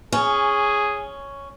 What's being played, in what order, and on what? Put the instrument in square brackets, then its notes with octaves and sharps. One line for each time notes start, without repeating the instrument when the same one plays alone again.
[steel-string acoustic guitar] C#4 [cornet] G#4